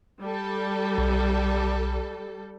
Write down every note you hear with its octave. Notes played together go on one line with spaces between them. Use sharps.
G3 A4
B1